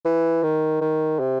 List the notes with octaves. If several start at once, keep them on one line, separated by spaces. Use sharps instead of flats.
E3
D#3
D#3
C3